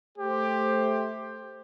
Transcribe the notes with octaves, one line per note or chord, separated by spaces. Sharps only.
A3 G4 C5